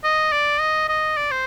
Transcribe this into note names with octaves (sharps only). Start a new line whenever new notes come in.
D#5
D5
D#5
D#5
D5
C5